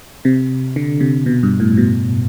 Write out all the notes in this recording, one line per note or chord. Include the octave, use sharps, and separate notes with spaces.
C3
D3
C3
B2
G2
A2
B2